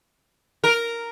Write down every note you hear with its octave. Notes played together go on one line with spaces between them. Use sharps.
A#4